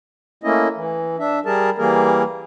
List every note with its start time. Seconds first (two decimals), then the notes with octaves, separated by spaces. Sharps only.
0.44 A3 A#3 C#4 E4 D#5
0.76 E3
1.19 D4 E5
1.45 G3 G#4 A#4 A5
1.78 E3 G3 A#3 G#4 A#4